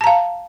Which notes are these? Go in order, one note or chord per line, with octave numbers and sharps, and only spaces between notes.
F5 A5 A#5